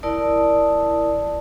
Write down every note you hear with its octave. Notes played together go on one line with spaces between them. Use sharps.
E4 A#4 D5 A5 D#6